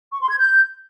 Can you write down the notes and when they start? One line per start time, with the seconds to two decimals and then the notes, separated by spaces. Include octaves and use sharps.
0.13 C#6
0.21 C6
0.30 G#6
0.38 G6